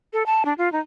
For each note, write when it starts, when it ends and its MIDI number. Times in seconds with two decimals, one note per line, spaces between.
0.13 0.23 69
0.26 0.43 81
0.45 0.53 62
0.58 0.72 65
0.72 0.80 63